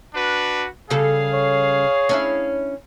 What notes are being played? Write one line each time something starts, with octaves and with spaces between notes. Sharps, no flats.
D4 F#4 B4
C#3 G3 G#4 A4 F5
C#5
C#4 D4 E4